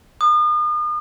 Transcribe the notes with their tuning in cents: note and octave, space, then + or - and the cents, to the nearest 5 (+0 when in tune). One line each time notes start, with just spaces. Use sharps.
D#6 -40